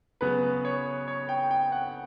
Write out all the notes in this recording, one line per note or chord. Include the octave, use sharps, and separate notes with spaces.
C#3 F#3 B3 B4
C#5
C#5
G5
G5
F#5